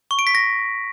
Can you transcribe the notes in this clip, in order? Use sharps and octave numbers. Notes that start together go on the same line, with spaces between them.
C#6
D7
B6
A#6